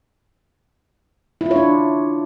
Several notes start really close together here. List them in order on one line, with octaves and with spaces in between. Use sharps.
E4 F4 C#5 D4